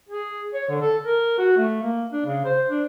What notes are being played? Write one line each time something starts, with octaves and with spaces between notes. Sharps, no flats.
G#4
C#5
D3
A4
A#4
F#4
A3
A#3
D4
C#3
C5
D4